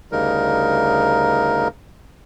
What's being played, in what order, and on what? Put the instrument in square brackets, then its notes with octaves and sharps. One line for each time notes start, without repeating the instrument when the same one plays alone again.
[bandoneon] D2 C#3 G3 D#4 A#4